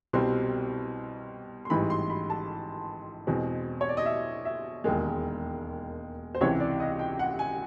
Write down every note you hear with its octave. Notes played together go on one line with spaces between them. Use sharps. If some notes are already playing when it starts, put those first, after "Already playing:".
C2 B2 G3 C4 C6
C6
A1 G#2 E3 G3 B5
C6
B5
A5
E2 B2 G#3 C4
C#5
D5
D#5
E5
E5
E1 D#2 D#3 G#3
C5
C#2 C3 E3 C#5
D5
D#5
G5
F#5
G#5